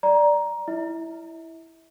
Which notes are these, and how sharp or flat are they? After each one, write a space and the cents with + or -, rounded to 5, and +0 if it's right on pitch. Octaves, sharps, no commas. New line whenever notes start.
D5 +0 A#5 +10
E4 +0 E5 -35